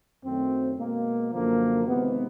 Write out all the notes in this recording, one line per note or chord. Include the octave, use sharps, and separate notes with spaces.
F#2 D#3 F#3 A3 C4
B2 G#3 A#3
F#2 D3 F3 A#3
C3 D#3 G#3 B3